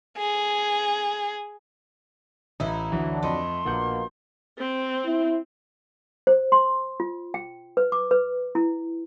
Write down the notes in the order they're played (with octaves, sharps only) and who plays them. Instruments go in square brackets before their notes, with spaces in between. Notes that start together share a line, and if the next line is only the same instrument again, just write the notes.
[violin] G#4
[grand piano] A1 [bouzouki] D#4 E4
[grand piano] D2 E3 [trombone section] F#3 D4
[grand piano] F2 D#5 B5 [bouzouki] A3 [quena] C6
[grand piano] A#1 F#5 G6 [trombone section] B2 A#3
[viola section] C4
[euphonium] E4
[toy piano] C5
C6
F4
G5
B4
D6
B4
E4